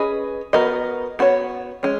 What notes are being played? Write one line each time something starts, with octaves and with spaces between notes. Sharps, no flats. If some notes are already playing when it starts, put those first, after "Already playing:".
Already playing: C#4 G#4 B4 D#5
B3 F#4 A#4 D#5
B3 F#4 C#5
G#3 C#4